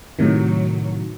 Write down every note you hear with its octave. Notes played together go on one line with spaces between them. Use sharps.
A2 C3 D#3 F#3